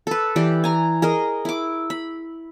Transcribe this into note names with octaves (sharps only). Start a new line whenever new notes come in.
A4 B4
E3 G4 D5
G#5 A#5
G#4 A#4 D#5
E4 D6
B5